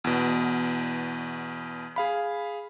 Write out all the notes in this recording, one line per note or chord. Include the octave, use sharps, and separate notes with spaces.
E2 B2
G#4 F5 B5